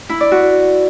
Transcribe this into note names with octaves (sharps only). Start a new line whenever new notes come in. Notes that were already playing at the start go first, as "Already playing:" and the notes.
E4
D5
F#4